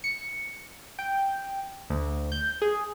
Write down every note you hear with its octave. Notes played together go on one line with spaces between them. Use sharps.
C#7
G5
D2
G6
G#4